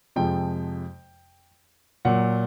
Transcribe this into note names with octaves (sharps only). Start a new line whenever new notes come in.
F2 C3 F3 G#3 G5
A#2 F#3 F#5